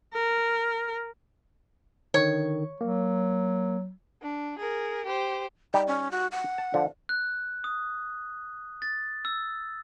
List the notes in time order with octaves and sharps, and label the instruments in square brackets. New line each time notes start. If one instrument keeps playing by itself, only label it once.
[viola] A#4
[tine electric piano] D3 D#3 [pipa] C#5
[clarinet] F#3 [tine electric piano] A#3
[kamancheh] D4
G#4 A#4
G4 C5
[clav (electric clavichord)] G3 D#4 [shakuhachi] G5
[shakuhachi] C#4
F#4
F#5
[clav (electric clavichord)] A5
D3 F3
[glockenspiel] F#6
D#6
A6
E6